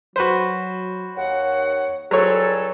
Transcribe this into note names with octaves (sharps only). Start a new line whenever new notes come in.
F#3 F#4 B4 C5
D#2 C#5 F#5
C#2 F#3 G3 G#4 A4 C5 C#5